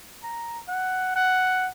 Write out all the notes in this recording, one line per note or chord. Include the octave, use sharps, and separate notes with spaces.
A#5
F#5
F#5